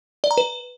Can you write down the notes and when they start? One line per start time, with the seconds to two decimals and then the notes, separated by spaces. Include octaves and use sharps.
0.24 D5
0.31 A#5
0.37 B4